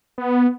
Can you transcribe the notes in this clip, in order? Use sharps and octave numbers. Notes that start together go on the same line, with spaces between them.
B3